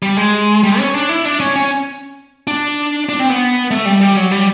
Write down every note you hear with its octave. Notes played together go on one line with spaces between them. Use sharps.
G3
G#3
G3
C#4
D4
E4
D4
C#4
C#4
D4
D4
C4
B3
A3
G3
G3
F#3
G3